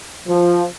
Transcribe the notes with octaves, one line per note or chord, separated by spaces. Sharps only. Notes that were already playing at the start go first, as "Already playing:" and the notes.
F3